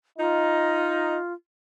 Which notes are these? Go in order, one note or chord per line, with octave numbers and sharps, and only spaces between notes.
D#4 F4